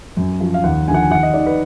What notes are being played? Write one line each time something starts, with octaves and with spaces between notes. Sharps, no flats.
F#2
F3
F5
D#2 F#5
D3 F3 F#5 G#5
G#5
D#2 F#5
D#5
D#3 D5
B4